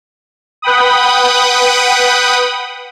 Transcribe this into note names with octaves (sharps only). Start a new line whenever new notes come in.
B4 F#5 G5 B5 D#6